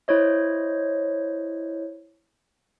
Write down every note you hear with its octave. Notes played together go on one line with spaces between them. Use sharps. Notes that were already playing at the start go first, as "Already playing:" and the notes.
E4 C5 C#5 D#5